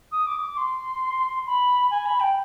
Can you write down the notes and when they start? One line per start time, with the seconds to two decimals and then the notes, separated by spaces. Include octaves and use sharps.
0.12 D#6
0.26 D6
0.41 D6
0.57 C6
1.46 B5
1.90 G#5
2.06 B5
2.20 G5